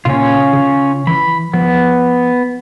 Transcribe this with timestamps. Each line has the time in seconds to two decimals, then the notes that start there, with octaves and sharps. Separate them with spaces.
0.05 A#2 C#3 C#4 F4
0.53 C#3
1.07 E3 B5
1.54 F3 B3